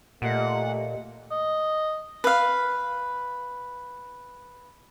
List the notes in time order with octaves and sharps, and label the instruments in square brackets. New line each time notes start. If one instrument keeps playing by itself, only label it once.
[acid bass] A#2 [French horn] A3 [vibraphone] G4 D#5 [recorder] F#5
[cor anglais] D#5
[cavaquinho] B4 F5